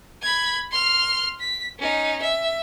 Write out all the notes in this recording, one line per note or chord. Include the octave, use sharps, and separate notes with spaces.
B5 G#6
C6 F6
B6
C#4 D#4
E5